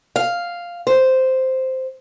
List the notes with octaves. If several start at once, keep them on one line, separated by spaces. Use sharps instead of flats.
F5
C5